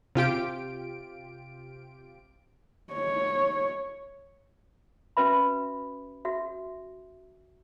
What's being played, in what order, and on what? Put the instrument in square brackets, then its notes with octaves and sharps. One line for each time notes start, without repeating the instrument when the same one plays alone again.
[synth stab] C3 F4 G4 D7
[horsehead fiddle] C#5
[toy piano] C#4 F#4 B4 E5 B5
F#4 E5